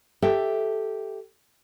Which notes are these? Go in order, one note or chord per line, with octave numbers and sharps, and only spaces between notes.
G4 A4 E5 G5